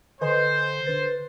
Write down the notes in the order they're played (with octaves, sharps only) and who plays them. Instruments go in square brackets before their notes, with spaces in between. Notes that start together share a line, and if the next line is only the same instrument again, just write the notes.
[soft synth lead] D3 [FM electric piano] B4 D#5 G#5 [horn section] C5
[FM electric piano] D3 A6 [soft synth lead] B4